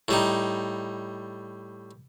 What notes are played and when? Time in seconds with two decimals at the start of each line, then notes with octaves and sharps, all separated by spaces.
0.08 A2 G3 D#4